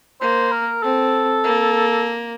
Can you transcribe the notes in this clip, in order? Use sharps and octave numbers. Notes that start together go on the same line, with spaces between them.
A#3 C5
A#4
C4 A4
A#3